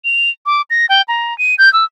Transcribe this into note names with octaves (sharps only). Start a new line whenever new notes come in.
F7
D6
A#6
G5
A#5
D#7
G6
E6